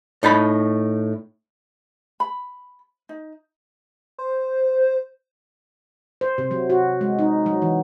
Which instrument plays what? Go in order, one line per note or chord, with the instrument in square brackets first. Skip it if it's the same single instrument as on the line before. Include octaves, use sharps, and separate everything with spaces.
[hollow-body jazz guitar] A2 D#4 A5 B5
[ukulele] B5
D#4
[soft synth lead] C5
[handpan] C5
C3
F#3
F#4
G#3
D#4
F#3
E3